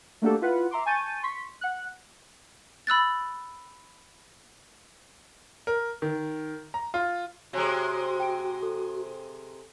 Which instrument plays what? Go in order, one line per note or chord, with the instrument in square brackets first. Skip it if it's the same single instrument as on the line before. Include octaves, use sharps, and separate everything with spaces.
[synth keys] A3 A#3 D4 F#4 G4 A4
E4 F4 B4 F#5
E5 A#5 C6 D6
G#5 A5 C#6 G6 A6 D#7
C6 C#6 B6
F#5 F#6
[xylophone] B5 E6 F#6 A6
[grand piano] A#4
D#3
A#5
F4
[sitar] C3 G#3 [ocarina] F#4 [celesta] C#5 G#5 A#5
[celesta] G5 D7
A4